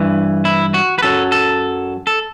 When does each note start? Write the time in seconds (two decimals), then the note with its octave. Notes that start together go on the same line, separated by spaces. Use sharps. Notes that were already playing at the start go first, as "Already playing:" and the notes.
Already playing: G2 E3
0.45 E4
0.74 F#4
0.98 B4
1.03 F#2 F#3 A4
1.32 A4
2.07 A4